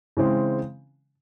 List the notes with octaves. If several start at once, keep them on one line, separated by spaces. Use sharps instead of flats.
C#3 E3 G#3 C4